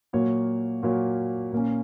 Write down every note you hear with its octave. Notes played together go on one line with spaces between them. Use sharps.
A#2 F#3 A#3 F#4 C#5
A#2 F#3 A#3 F#4 C#5
A#2 A#3 C#4